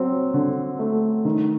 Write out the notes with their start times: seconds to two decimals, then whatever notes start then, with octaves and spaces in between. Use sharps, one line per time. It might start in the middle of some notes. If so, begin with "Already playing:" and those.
Already playing: F#3 C4
0.34 D3
0.79 A3
1.25 D#3